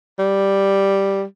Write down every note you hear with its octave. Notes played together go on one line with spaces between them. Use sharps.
G3